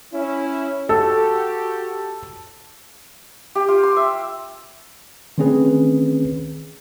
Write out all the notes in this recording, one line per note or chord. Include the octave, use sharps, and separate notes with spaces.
C#4 E4
F#4 G4 A4
G4
F4
C6
E5
D#3 A3 C4 C#4 G#4 B4